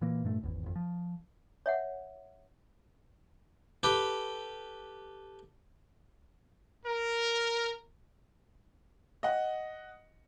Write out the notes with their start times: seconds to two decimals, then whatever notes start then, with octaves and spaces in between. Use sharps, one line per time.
0.01 A#2 E3 A#3
0.24 G2 A#2 A3
0.41 D#1 G#1 E2
0.63 G#1 F2
0.76 F3
1.66 C#5 E5 F#5
3.83 G4 A4 B4
6.85 A#4
9.23 D#5 F#5